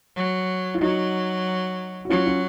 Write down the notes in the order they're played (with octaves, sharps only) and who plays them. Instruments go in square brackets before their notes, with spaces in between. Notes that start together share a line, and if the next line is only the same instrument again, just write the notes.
[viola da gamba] F#3
[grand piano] F4
[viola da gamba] F#3 [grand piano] D#4 F#4
[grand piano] F#4
[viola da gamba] F#3 [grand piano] C#4 F4
[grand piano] C#4 F4